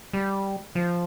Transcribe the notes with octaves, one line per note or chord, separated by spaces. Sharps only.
G3
F3